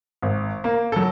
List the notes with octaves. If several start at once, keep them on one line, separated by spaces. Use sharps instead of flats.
G#1
A#3
F#3 A4